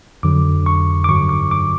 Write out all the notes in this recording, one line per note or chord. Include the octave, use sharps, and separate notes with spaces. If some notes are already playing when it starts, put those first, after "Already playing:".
F2 D3 F#3 D6
C#6
D6
G2 D3 F#3 C#6
D6
D6